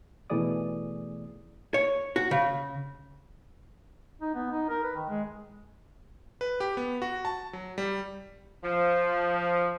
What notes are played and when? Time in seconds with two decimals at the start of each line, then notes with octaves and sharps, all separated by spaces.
0.30 B2 E3 A3 G#4 D5 D#6
1.74 C#5
2.16 F#4
2.31 C#3
4.21 D#4
4.35 B3
4.51 D#4
4.69 A#4
4.83 B4
4.96 D#3
5.09 G#3
6.41 B4
6.60 G4
6.77 B3
7.02 F#4
7.25 A5
7.53 F#3
7.78 G3
8.64 F3